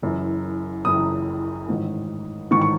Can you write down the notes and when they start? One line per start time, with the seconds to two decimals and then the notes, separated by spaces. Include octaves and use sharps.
0.02 F#1 F#2 E3
0.85 F#1 F#2 E3 D#6
1.69 A1 G#2 D#3
2.51 A1 G#2 D#3 C#6
2.62 C#6